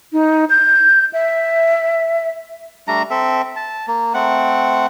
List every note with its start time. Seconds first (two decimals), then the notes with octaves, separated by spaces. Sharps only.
0.13 D#4
0.50 G6
1.13 E5
2.88 G3 A3 D4 A#5
3.10 C4 A4 E5
3.56 A5
3.88 A#3
4.14 A3 C4 F#5